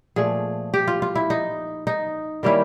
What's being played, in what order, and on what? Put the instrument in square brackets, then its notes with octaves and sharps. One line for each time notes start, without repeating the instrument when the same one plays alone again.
[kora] A#2 F3 A3 G#4
G4
F4
F4
E4
D#4
D#4
D#3 G3 A#3 C#4 E4